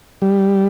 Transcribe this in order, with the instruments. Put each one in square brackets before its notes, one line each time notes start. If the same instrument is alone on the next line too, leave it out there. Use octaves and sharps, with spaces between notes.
[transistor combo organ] G3